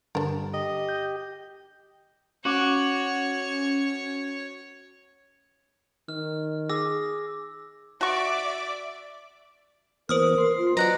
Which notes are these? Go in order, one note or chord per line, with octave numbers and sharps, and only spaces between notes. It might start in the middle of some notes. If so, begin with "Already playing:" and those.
G2 D3 G3 D4 A#4
G4 D#5
G6
C#4 F#4 C#5 F#5 D6
D#3 F6
G#4 D6 E6 A#6
F#4 D5 E5 C#6 D6
E3 A#3 B3 A#4 C5 D#6 F6
C6
F4
F#3 B4 D5 D#5 F#5 A#5